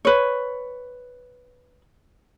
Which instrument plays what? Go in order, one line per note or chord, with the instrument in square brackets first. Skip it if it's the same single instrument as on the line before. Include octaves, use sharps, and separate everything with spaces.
[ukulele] B4 C#5